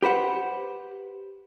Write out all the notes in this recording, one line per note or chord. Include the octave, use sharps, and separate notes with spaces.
G4 B4 C5 F#5